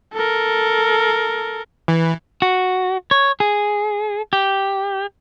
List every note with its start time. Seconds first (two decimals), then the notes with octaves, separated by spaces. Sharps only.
0.14 A4 A#4
1.88 E3
2.42 F#4
3.11 C#5
3.40 G#4
4.33 G4